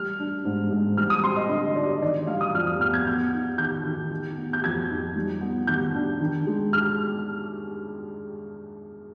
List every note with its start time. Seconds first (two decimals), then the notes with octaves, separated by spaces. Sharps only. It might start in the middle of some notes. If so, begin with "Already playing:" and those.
Already playing: G3 F6
0.19 D4
0.45 G#2
0.71 G#2
0.97 G3 F6
1.10 D#6
1.24 C4 C6
1.37 D#5
1.49 D3 D#5
1.76 D#4 D5
1.89 D#5
2.02 D#3 D5
2.27 G3 F5
2.41 D#6
2.54 F2 F6
2.67 D#6
2.80 B3 F6
2.94 G#6
3.06 B3 G6
3.33 D#4
3.58 D#3 G6
3.85 D#3
4.11 D#3
4.38 B3
4.53 G6
4.64 F2 G#6
4.90 D#4
5.16 G3
5.41 B3
5.67 D#3 G6
5.95 D4
6.21 D#3
6.47 G#3
6.73 F6